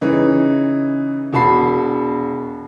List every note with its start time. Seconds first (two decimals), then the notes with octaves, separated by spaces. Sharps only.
0.01 C#3 E3 D#4
1.33 E1 F#4 A5 B5 C7